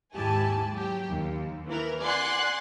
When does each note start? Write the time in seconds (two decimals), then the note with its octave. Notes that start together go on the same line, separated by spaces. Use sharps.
0.15 D#2 G#2 E4 G4 G#5 A5
0.75 F#3 G4
1.09 D#2
1.68 E3 A#4
2.02 D5 F#5 G#5 C6 F#6